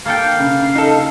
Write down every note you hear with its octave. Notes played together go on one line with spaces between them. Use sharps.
A#3 A4 F5 G5
C#3
D#4 A4